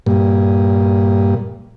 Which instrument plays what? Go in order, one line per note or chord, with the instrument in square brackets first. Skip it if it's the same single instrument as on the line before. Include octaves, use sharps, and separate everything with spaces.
[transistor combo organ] G2 A#2